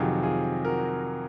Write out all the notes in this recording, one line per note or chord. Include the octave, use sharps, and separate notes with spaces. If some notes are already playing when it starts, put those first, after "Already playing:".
Already playing: F2 C3 D#3 F#3 F4 G#4
F4 G#4
F#4 A#4